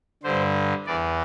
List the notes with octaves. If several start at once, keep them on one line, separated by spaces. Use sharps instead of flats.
G2 D3 C5
E2 E3 D5